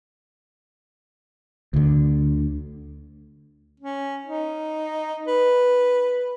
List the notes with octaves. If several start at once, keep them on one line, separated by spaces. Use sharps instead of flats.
D2 D3
C#4
D#4
B4